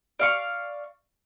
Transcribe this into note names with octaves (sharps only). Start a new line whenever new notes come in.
D5 F5 C#6